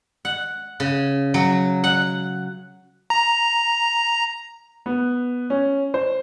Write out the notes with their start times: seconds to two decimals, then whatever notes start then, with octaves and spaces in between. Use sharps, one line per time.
0.25 F#5
0.80 C#3
1.34 F#3
1.84 F#5
3.10 A#5
4.86 B3
5.50 C#4
5.94 C5